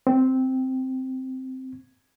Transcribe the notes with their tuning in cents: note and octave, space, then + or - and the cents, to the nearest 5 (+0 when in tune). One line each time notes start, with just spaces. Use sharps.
C4 -5